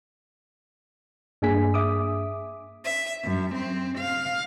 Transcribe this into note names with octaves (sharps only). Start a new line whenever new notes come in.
G2 A#3 D4 G#4 G#5 B6
E5 D6 D#6
E5
F#2
C4
F5